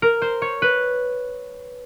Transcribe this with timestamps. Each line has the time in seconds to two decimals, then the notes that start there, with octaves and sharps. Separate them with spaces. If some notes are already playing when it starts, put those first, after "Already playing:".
0.02 A#4
0.22 C5
0.42 C#5
0.62 B4